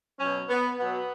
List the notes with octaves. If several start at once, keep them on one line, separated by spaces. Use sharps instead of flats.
B2 F#3 C#4
B3
B2 F#3 B3